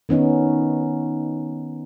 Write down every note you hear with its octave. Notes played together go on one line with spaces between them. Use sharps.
D#3 B3 C#4 D#4